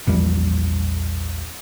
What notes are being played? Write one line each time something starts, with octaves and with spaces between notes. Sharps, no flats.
A#1 E2 F3 G3